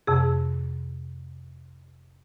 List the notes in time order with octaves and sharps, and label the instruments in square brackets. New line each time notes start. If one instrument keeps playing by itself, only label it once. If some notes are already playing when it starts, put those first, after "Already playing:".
[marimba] F2 C3 G#4